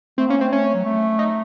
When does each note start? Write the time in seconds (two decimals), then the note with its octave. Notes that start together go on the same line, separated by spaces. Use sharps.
0.18 A3 C4
0.28 A#3 C#4
0.37 A3 C4
0.53 C#4
0.74 F#3
0.85 A3
1.19 D#4